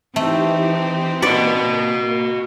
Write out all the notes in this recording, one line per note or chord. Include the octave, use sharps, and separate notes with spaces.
E3 A3 C4 D#4 G4
A#3 F#4 B4 D5 D#5